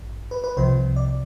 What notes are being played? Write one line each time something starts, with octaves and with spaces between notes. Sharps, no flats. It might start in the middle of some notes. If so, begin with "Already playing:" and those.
Already playing: A1 G2
B4
B4
C2 C3 F3 C5
D5